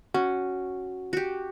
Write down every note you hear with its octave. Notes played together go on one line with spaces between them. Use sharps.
C#4 F#4
F#4 G4